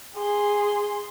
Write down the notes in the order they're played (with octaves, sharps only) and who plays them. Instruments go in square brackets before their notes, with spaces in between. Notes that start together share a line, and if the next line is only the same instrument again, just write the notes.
[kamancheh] G#4 [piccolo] C6